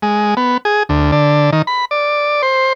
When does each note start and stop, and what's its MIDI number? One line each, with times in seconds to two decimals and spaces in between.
0.02 0.35 56
0.37 0.57 59
0.65 0.83 68
0.89 1.11 38
1.12 1.50 50
1.52 1.62 51
1.67 1.85 83
1.91 2.42 74
2.42 2.73 72